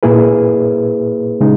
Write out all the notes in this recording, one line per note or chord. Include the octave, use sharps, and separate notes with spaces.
A#2 A#3 E4 G#4 B4
C#3 G#3 D#4